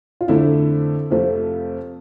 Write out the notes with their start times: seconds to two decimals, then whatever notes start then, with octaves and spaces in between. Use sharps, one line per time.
0.21 F4
0.28 F2 D3 A3 E4
1.10 F2 C3 F3 A3